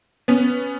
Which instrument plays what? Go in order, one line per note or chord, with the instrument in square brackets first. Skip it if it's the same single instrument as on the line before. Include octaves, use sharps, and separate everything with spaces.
[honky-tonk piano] B3 C#4